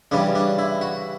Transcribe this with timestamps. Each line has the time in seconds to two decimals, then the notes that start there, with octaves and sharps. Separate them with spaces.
0.11 C#3 E3 G3 D4
0.35 D4
0.58 E4
0.81 F#4